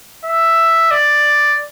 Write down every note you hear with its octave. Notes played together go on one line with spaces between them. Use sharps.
E5
D5